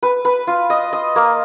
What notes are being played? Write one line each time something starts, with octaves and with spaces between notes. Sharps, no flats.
B4
B4
F4
D#5
D#5
A#3